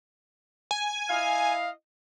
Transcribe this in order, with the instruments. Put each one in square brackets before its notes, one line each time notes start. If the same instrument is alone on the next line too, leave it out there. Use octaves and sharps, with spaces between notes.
[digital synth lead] G#5
[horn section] E4 D#5 F5